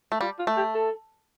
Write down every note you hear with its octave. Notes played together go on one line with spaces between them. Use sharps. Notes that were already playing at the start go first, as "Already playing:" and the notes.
A3
G3 F4
F4
A3
G4
A4